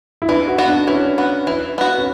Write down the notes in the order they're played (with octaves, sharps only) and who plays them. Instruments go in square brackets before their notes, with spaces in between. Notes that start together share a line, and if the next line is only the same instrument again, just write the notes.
[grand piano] E4
[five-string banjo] E3 [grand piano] D4
[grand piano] F#4
[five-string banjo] B3 F#4
[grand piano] D4
[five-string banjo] E3 [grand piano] C#4
[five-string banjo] B3 F#4
E3
B3 F#4
[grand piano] C#4